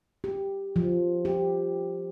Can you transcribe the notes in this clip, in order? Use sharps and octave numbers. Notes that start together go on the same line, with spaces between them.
G4
F3
G4